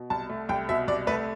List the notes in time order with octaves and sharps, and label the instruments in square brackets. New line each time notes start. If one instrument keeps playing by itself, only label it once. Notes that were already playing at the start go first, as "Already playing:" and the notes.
Already playing: [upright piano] B2
C2 A5
A3
C2 G5
B2 E5
C2 D5
A3 B4